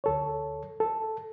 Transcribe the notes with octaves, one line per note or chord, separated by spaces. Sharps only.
D2 A4 C#5
A4